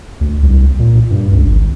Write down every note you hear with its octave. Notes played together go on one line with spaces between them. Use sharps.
D2
C2
A#2
G2
C#2
G#1